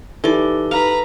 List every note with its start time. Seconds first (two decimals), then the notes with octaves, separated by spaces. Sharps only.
0.24 E3 D#4 G4 A4 D5 G7
0.71 B4 F5 A#5